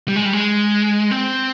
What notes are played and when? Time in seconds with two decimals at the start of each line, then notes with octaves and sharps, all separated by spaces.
0.08 G3
0.16 G#3
0.25 G3
0.33 G#3
1.11 C4